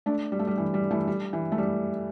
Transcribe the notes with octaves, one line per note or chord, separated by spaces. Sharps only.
A3 D4
G3
A3
G3
E3
G3
E3 A3
G3
E3
A3
G3